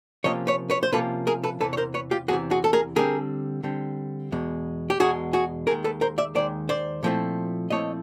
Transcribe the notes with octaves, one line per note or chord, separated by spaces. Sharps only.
C3 F3 A#3 C#4 F4 C#5 D#5
B4 C#5
B4 C#5
C5
C3 F3 A#3 C#4 F4 A4 B4
G#4 A#4
A4 B4
E2 C3 E3 A4 B4
C#5
A#4 C5
B4 C#5
F4 G4
E2 C3 E3 F#4 G#4
F#4 G#4
A4
G#4 A#4
D3 G3 C4 G#4 A#4
D3 G3 C4
E2 B2 G#3
G4
E2 B2 G#3 F#4 G#4
F#4 G#4
D#2 D#3 G#3 G#4 A#4
A4 B4
A#4 C5
D5 E5
D#2 D#3 G#3 C5 D5
C5 D5
A#2 F3 A3 C4 E4
A#2 F3 A3 C4 E4 C#5 D#5